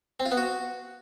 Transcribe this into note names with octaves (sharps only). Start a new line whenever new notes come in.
C4
F4
B3
F#4